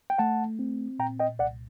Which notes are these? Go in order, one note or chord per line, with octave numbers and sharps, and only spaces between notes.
G5
A3 F#5 A5
C4
A#2 G5 A#5
D#5 G5
C2 D5 F#5